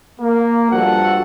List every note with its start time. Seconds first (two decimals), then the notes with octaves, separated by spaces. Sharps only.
0.20 A#3
0.71 G2 F3 F#4 A4 F#5